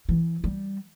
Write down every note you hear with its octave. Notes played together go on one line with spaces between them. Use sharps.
E3
G3